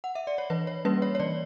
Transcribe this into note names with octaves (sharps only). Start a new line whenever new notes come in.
F#5
E5
D5
C#5
E3 B4
C#5
G3 A#3 C#4 B4
C#5
C#5
E3 D5